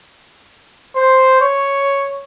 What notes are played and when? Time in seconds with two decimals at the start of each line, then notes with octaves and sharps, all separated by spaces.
0.96 C5
1.40 C#5